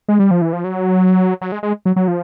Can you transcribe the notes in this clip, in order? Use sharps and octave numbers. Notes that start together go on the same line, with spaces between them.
G#3
G3
F3
E3
F3
F#3
F#3
G#3
G#3
F#3
F#3
F3